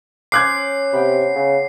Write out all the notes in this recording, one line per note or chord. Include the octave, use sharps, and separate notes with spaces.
C#4 C5 C#5 D6 F#6 G#6 C7
C3 B3 G5 B5
C#3